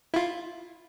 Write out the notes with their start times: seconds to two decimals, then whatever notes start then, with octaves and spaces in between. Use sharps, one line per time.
0.14 E4 F4